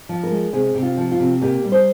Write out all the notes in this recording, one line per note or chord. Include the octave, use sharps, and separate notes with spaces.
F3
A#4
G#3
C3 G#4
C3
F4
F3
F4
C3
A#2 G4
G3
C5